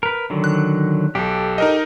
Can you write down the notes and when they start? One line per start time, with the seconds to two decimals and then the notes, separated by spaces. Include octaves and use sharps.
0.03 A#4 B4
0.30 D3 D#3 F#3
0.44 F#6
1.15 B1 G4 A4
1.58 D#4 A#4 D#5